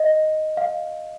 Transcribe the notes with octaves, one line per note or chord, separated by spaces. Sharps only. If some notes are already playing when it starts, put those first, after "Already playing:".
Already playing: D#5
F5